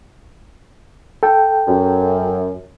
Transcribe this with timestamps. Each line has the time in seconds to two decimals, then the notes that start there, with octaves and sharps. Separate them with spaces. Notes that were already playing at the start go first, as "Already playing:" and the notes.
1.23 A4 G5
1.68 F#2